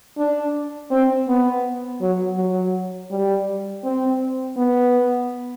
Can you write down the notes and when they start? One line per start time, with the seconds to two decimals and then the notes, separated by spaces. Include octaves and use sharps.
0.17 D4
0.91 C4
1.28 B3
2.01 F#3
2.37 F#3
3.10 G3
3.84 C4
4.57 B3